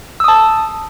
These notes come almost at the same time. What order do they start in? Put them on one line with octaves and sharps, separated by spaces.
E6 D#6 A5